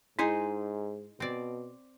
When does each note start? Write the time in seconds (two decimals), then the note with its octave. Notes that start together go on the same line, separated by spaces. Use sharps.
0.19 G#2 D#4 E4 G#4 C5
1.20 B2 C4 D5